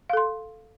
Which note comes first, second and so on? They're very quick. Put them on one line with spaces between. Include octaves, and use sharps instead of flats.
F5 A4 C6